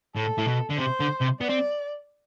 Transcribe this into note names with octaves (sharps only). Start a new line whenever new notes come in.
A2 A4
A2
B2
D3
C3 C5
D3
C3
B3 D5
C4